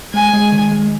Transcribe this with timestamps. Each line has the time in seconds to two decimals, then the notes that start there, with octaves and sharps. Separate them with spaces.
0.14 G#3 G#5
0.34 G#3
0.52 D#3
0.72 G#3